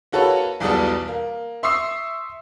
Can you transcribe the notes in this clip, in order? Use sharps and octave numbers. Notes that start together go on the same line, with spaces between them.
A#3 F#4 A4 B4 C#5
B1 E2 B2 G3 B3 A4
A#3
E5 C6 C#6 D#6 E6 C7